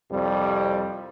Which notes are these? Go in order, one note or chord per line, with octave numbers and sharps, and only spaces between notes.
C2 F2 G3